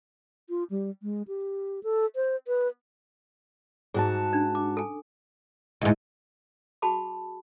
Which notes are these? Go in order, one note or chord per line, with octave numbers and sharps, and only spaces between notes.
F4
G3
G#3
G4
A4
C5
B4
G#2 F#4 G#4 A5
C#4 D4
D6
A4 G#5
D2 G#2 E4 G#4 D#5
F#4 G#4 A5 B5 D6